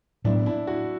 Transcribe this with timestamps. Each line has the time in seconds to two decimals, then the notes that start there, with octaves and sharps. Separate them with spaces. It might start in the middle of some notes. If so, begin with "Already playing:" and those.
0.24 A2 F#3 B3 D4 E4
0.46 D4 E4
0.67 E4 F#4